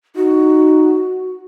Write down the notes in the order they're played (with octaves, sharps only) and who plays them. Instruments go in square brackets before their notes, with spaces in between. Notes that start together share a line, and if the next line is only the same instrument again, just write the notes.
[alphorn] D#4 [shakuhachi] F#4